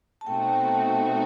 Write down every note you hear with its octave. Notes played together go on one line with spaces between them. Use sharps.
A5
B2 A3 C4 D#4 F#4 G5
A5